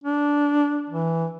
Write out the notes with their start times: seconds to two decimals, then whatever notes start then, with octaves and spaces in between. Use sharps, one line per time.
0.04 D4
0.90 E3